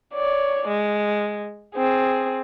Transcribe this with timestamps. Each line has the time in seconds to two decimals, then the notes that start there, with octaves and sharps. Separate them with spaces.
0.14 C#5 D5
0.68 G#3
1.75 C4 G#4